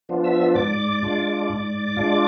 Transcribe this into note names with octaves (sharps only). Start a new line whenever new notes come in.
F3 B3 D4 F4
E5 E6
G#2 D5 D6
G#3 D4 F4
G#2
G#3 D4 F4